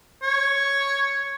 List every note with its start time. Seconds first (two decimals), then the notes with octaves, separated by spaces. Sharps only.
0.23 C#5